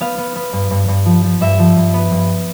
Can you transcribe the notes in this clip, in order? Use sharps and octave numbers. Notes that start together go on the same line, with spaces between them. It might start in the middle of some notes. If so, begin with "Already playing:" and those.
B3 F5
B3
B3
G2
G2
G2
F3
F3
G2 E5
F3
G2
B3
G2